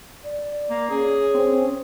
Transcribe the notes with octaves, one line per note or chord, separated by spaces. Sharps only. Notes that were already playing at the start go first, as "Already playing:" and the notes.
D5
A#3
C#4 G#4
C4